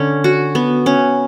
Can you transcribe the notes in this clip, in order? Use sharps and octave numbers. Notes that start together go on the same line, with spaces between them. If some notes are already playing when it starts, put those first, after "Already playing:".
Already playing: D3 C#4
F#4
B3
C#4